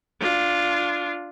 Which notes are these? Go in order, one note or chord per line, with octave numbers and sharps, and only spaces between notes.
D4 F4